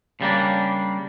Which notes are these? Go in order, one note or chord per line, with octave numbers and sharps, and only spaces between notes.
C#3 G3 A#3 D4